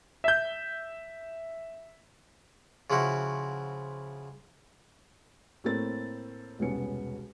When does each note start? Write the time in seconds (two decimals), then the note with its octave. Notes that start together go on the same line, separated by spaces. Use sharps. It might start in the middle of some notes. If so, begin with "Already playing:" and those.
0.24 E5 G6
2.90 C#3 F3 E4 F#4
5.64 A2 A3 A#3 C4 A6
6.59 E1 C2 B3 C#4 C#7